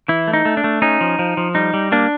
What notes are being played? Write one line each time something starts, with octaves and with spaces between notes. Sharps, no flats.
E3 E4
A3
D#4
A3
D4
A3
C#4 D#4
F3
F3
F3
G3 D#4
G3
A#3 D4